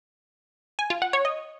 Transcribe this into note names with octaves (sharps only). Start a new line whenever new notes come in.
G#5
F4
F#5
C#5
D#5